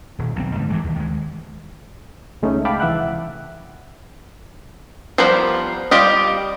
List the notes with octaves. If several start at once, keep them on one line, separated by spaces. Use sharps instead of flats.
D#1
B1 C4
G#2 D3
G2 E3 G#3
D#2
D#3 G#3
C#2 G#3 A3 C#4 D#4
F5 G5 A5 B5 D6
C2 E3 E5 F#5 F#6
F3 G3 B3 A#4 C5
G3 F4 G4 D#5